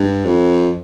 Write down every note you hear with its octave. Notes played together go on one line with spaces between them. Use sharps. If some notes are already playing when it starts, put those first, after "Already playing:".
Already playing: G2
F2